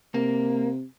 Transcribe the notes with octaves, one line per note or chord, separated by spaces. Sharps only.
C3 A#3